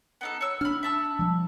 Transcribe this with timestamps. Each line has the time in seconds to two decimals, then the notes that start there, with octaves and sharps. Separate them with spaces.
0.21 B3 D#4 A4
0.41 C#5 E6
0.61 D4 B5 F6
0.83 E5 A5 E6
1.19 F3 G3